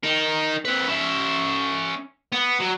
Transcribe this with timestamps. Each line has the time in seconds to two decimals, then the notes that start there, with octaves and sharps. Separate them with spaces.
0.03 D#4 A#4
0.65 C4 B4
0.88 C#4 E5
2.33 B3
2.60 F#3